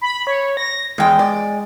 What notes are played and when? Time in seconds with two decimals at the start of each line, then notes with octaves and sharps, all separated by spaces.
0.01 B5
0.27 C#5
0.57 A#6
0.98 E2 G#3 G5
1.19 D5